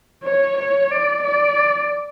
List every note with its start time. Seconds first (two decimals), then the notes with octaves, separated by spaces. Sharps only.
0.24 C#5
0.58 C#5
0.91 D5
1.24 D5